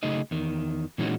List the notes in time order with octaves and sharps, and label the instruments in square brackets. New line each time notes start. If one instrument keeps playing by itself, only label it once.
[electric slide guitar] C#3 F#3 A3 D#4 G#4 D#5
E2 D#3
A#2 E3 G#3 C#4 D#4 F#4